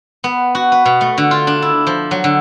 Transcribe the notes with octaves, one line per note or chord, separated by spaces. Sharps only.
B3
F#4
B4
B2
A3
D3
F4
D4
E4
F3
F#3
D3